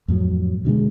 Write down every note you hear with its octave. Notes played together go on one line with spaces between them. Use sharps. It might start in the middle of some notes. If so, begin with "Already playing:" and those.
F2 A2 F#3
B2 D3 F3 G#3